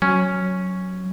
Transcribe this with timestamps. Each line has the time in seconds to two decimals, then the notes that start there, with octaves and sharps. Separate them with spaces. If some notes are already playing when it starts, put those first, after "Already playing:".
0.02 F#3 C#4